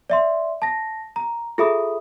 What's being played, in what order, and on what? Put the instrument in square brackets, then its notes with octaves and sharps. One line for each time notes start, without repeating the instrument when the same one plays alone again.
[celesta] D5 E5 C6
A5 A#6
A#5
F4 G#4 A4 E5 B5 D#6